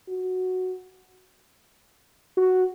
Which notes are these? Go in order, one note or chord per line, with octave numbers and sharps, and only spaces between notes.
F#4
F#4